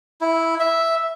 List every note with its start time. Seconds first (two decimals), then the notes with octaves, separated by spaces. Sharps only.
0.21 E4
0.60 E5